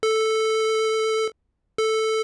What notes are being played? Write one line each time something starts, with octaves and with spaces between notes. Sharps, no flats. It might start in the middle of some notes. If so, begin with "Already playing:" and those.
A4
A4